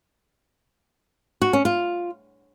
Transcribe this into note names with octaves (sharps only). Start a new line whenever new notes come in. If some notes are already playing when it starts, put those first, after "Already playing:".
F#4
C#4
F4